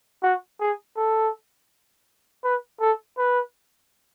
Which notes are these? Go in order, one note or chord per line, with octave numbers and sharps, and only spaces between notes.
F#4
G#4
A4
B4
A4
B4